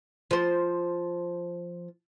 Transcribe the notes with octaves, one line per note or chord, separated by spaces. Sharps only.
F3 C5